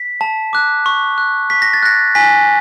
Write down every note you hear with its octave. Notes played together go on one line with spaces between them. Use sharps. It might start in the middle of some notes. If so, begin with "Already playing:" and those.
Already playing: B6
A5
D6 F#6
C#6
F#6
C#6 B6
A#6
A6
F#6 A#6
G#5 B6